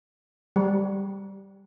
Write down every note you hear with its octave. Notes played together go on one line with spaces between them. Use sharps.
G3